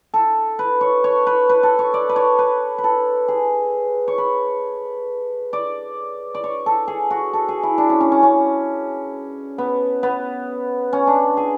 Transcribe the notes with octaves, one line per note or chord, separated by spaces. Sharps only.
A4
B4
C#5
C#5
B4
B4
A4
C#5
D5
B4
C#5
B4
B4
A4
G#4
C#5
B4
D5
D5
C#5
A4
G#4
F#4
A4
G#4
E4
D4
C#4
C#4
C#4
C#4
B3
B3
C#4
D4
G#4